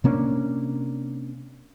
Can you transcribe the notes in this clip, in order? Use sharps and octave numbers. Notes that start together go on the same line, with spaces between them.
C3 A#3 C#4 D4